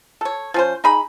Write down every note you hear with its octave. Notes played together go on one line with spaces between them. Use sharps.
A4 C#5
F3 C#4 C5
D#4 G#4 B5